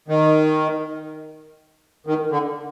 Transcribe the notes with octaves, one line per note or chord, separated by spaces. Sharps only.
D#3
D#3
D3